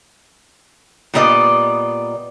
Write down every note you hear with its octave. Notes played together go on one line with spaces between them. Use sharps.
A#2 G3 B3 D5 D#5